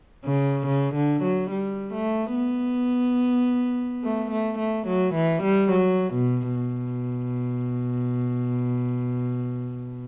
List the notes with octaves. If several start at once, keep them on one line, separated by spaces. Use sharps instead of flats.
C#3
C#3
D3
F#3
G3
A3
B3
A3
A3
A3
F#3
E3
G3
F#3
B2
B2